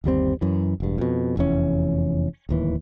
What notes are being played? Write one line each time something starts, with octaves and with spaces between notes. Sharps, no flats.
G1 D#2 G3 C4
F#2 E3
E1 G2
F2 B2
F1 E2 E3 C#4
D1 D#2 E3